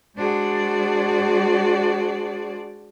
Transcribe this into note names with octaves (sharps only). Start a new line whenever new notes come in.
G#3 D4 F#4 G#4 C5 D5